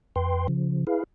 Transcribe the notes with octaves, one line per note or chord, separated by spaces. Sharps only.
F2 B4 G5 C6
C#3 F3
E4 G#4 B4 F5